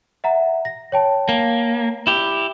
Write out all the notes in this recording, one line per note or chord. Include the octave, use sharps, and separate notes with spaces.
E5 F#5 A#5
A#6
C#5 G5 A5
A#3
E4 G4